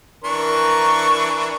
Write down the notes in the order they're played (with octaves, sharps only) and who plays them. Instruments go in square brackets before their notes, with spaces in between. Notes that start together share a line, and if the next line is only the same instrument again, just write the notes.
[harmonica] E3 D4 C#6 [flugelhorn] A#4